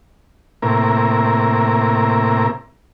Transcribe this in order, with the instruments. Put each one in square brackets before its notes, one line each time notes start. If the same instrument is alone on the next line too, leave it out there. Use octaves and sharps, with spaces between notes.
[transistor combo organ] A2 C3 A#3 E4 A#4